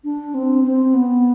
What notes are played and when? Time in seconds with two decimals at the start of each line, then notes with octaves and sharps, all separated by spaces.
0.04 D4
0.34 C4
0.64 C4
0.94 B3